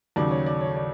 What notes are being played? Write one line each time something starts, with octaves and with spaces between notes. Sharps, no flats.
D#2 C#3 F#3 D5
C#5
D5
C#5
D5